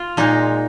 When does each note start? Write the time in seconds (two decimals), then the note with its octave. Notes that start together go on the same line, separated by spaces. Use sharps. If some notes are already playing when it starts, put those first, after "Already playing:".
Already playing: F4
0.17 A#2 G#3 D#4